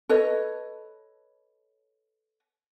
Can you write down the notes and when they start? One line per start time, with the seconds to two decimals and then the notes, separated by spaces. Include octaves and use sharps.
0.09 A4 B4 C#5 D#5